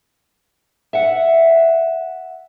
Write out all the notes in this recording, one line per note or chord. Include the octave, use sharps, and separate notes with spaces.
E5 F#5